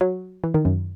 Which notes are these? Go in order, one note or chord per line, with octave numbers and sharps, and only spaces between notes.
F#3
E3
D#3
F#2